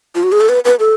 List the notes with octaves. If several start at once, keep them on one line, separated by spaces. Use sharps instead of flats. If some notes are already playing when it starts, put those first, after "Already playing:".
F4
F#4
G#4
A4
B4
B4
A4